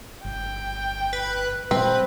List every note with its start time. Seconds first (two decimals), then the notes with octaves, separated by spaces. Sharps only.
0.25 G1 G5
1.13 B4
1.71 A#2 G3 C4 B4